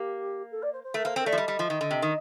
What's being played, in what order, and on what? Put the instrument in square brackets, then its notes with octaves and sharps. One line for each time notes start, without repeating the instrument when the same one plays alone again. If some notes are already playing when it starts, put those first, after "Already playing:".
Already playing: [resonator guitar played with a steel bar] A#3 [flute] G4
[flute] A4
D5
C5
C5
[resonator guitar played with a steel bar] A3 [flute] A#4
[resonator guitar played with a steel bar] A#3 [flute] C5
[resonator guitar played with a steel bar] C4 [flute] A#4
[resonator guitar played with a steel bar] A3 [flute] D5
[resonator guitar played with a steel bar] F3
[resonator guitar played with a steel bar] G3 [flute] D#5
[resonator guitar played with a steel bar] G3
F3
D#3
D3
C3
D#3